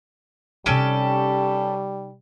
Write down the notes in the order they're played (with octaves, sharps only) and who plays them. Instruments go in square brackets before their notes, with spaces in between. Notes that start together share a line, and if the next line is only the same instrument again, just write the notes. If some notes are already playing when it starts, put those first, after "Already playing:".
[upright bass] C3 D#4 [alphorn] G3 [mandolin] C#4 G4 A4